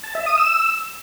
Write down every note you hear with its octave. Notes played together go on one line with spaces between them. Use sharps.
A5
E5
D#6
E6